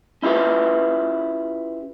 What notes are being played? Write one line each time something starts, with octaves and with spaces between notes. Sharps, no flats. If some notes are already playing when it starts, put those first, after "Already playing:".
C#4 E4 F4 G4 B4